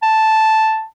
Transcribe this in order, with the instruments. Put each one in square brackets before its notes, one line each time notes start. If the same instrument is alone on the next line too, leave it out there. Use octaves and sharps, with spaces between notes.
[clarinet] A5